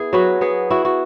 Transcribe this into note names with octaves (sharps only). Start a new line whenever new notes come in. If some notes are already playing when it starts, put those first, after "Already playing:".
Already playing: B3 E4 G#4
F#3 F#4 B4
B3 G#4
E4 F#4
F#4